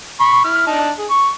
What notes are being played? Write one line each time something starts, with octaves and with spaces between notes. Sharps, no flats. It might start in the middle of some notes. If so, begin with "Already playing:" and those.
B5 C#6
E4 F6
D4 D#4 A5
G#4
C#6